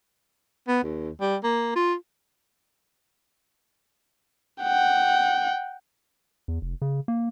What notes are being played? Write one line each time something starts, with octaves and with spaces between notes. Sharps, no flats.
B3
D#2
G3
A#3
F4
F#5 G5
E2
F1
C#3
A#3